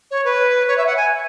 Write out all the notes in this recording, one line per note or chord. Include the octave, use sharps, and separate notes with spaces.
C#5
B4
C#5
E5
F#5
G#5